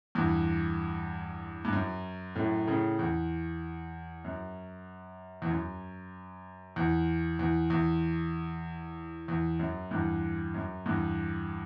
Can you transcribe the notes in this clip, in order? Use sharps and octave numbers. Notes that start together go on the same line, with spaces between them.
E2 G2
G2
F#2
F#2 A2
A2 C#3
E2
F#2
E2
F#2
E2
E2
E2
E2
F#2
E2 G2
F#2
E2 G2